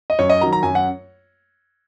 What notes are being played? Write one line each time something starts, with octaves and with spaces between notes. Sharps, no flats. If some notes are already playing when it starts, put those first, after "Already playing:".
D#5
F#2 C#5
D#5
D#3 F#3 A#5
A#5
F#2 G#5
F#5